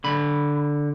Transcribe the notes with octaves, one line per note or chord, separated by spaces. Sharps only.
D3 B5